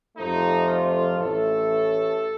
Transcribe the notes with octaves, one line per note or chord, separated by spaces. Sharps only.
F2 C3 F3 A3 D#4
F4
A1 A2 A3 A4